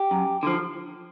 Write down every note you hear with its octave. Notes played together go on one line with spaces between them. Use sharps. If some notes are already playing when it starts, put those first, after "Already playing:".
Already playing: G4
F#2
D3 F3